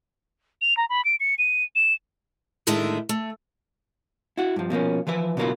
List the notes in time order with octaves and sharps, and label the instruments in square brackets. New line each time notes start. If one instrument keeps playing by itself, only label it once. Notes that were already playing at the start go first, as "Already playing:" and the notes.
[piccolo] F7
A#5
B5
D7
C#7
D#7
E7
[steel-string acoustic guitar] A2 D3 D#3 G#3 A3 E5
A3
[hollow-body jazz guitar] E4 F#4
G2 F3
B2 F3 A#3 C#4
E3 F3 B4 E5
B2 D3 F#3 A#3 E4 F4